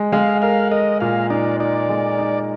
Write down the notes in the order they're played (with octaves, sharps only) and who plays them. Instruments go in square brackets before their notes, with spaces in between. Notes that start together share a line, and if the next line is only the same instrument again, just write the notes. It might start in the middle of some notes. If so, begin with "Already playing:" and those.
Already playing: [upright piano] G#3
[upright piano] G#3 [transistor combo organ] F5
[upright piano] A#4 [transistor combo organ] F5
[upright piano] A#4 [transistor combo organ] D#5
[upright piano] A#2 [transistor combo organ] F5
[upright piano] D#4 [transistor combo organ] D5
[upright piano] D#4 [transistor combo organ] D5
[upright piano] G#3
D#4